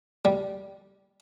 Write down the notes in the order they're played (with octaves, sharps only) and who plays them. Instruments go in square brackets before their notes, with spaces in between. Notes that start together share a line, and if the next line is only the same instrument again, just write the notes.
[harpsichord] G3